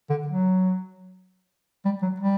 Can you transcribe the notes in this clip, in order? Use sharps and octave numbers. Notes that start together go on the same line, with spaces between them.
D3
F#3
G3
F#3
G3